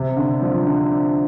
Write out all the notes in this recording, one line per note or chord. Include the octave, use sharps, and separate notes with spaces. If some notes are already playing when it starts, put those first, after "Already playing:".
Already playing: C3
D3
F3
D3